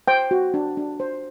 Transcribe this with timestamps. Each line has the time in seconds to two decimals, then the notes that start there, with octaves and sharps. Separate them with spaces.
0.08 C5 G5
0.31 F#4
0.54 D4
0.77 D4
1.00 C5